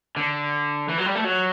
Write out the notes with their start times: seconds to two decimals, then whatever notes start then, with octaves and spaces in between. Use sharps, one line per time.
0.17 D3
0.89 E3
0.98 F#3
1.06 G3
1.15 A3
1.24 F#3